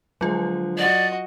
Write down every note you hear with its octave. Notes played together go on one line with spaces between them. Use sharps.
D3 F3 F#3 G#3 F4
F#4 D5 D#5